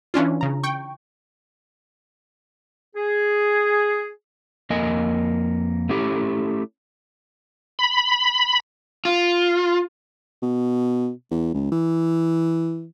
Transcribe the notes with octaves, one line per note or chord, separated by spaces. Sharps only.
E3 C#4 D4 F4
C#3 A#5
G5 C#6
G#4
F2 A#3 D#5 G#5
A3 C#4 E4 G4
B5
F4
B2
E2
C#2
E3